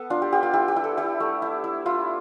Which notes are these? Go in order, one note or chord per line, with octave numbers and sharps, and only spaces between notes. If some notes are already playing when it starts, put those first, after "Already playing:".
Already playing: B3 A4
D4 F4
G4
B3 G4
F4
E4 G4
G4
E4
A4
E4 G4
A3
E4
E4
E4 F4